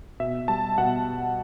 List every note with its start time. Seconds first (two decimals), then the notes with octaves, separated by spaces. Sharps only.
0.20 B2 E5
0.48 G3 A5
0.78 B2 F#5